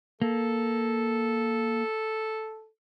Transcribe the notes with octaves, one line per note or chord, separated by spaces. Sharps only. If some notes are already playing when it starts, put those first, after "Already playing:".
A#3 A4